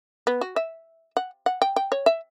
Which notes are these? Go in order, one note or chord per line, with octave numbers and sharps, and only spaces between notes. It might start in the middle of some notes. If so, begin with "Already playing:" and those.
B3
F#4
E5
F#5
F#5
G5
G5
C#5
E5